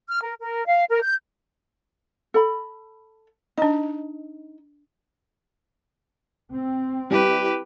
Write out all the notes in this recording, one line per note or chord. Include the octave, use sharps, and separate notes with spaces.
F6
A#4
A#4
F5
A#4
G6
A4 B5
D4 D#4 D#5
C4
G3 E4 G4 B4